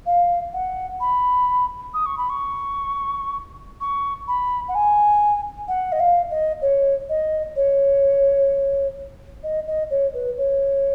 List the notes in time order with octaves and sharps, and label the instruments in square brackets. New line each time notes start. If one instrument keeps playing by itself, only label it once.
[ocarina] F5
F#5
B5
D#6
C#6
B5
C#6
C#6
B5
F#5
G#5
F#5
D#5
F5
D#5
C#5
D#5
C#5
D#5
D#5
C#5
B4
C#5